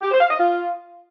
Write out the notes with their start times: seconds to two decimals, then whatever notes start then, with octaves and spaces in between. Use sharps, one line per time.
0.02 G4
0.11 C5
0.20 F5
0.29 D#5
0.39 F4